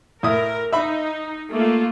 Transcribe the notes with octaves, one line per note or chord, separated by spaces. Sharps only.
A2 E4 A#4 D#6
D#4 E5 B5
A3 A#3 F4